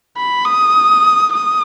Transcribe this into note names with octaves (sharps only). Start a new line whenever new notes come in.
B5
D#6
D#6